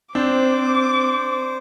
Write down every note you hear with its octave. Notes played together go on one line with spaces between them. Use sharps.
C4 D4 C5 D6